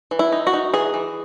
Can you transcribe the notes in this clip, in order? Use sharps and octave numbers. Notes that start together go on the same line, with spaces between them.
E3
E4
D#4
F#4
D#4
E3 G#4
E3